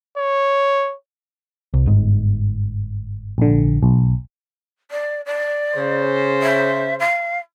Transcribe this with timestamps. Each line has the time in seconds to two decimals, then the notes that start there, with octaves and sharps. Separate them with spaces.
0.18 C#5
1.74 C2
1.86 G1 G#2
3.38 A#1 D3
3.83 B1
4.91 D5
5.26 D5
5.75 C#3 C5
6.42 E5
6.99 F5